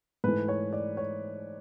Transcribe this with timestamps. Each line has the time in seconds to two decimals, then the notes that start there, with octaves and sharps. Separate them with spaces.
0.24 G#2 E3 A3 B4
0.48 C#5
0.73 D5
0.97 C#5